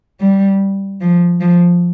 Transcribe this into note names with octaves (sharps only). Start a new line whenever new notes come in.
G3
F3
F3